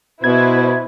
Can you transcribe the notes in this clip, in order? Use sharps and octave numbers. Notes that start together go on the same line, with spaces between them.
B2 B3 E4 B4 C5 G#6